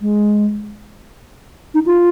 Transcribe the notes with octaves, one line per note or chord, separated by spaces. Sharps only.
G#3
D#4
F4